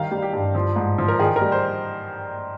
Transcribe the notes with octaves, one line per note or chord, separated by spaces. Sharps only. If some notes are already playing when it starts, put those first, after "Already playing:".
Already playing: D#3 G3 F5
G3
G4
G2
F3
G#2
F3
A#4
D#3 G#4
A#4
G3
C5